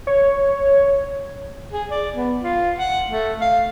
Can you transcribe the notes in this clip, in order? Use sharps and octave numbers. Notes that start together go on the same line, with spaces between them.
C#5
G#4
D5
B3
F4
F#5
A3
F5